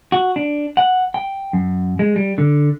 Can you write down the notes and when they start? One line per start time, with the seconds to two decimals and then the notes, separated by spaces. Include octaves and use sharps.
0.12 F#4
0.36 D4
0.77 F#5
1.14 G5
1.53 F#2
1.99 G#3
2.16 G3
2.38 D3